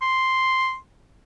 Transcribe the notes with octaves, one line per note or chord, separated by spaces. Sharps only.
C6